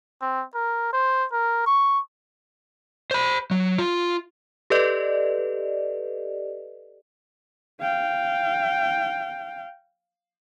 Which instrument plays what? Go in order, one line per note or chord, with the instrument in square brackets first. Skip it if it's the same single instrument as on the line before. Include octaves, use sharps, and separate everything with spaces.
[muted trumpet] C4
A#4
C5
A#4
C#6
[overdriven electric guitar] C5 B5
F#3
F4
[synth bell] G4 A4 B4 D5 D#5
[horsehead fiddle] F5 G5